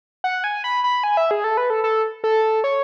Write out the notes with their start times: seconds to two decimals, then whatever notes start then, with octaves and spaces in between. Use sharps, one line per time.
0.24 F#5
0.44 G#5
0.64 B5
0.84 B5
1.04 G#5
1.17 E5
1.31 G#4
1.44 A4
1.57 B4
1.70 A4
1.84 A4
2.24 A4
2.64 C#5